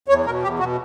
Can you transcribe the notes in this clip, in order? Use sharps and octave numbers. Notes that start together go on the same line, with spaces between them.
E2 C#5
B2 A#4
E2 G4
B2 F#4